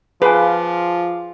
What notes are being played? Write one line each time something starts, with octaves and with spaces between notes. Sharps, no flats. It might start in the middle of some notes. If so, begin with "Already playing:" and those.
F3 F4 G#4 B4 F5 G#5 D6